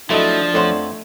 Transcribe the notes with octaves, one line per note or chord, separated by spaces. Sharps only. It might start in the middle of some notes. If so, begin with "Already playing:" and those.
F3 F#3 A3 D4 E4 A4 D#5
F2 A3 C5 C#5 F#5 C6